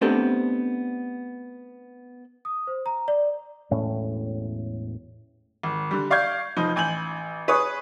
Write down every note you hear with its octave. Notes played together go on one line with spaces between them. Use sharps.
A3 B3 C4 D4 G4 A4
D#6
C5
A#5
D5
E1 A2 C#4
G#1
D3 G3
D5 F5 C#6 G6 G#6
F1 F3 D#4
A1 G#5 G6 F#7
G#4 B4 C#5 C#6 D#6